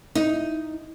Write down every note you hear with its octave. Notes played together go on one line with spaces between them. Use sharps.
D#4